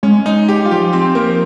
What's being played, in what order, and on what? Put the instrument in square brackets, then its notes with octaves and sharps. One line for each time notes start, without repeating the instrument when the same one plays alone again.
[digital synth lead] G#3 [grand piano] C#4
[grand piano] D#4
G4
[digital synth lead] G3 [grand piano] F4
[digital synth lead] F3 [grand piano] G4
[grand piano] C4
A#3